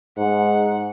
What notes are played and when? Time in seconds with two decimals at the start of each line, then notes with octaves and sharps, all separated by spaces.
0.17 G#2 F#5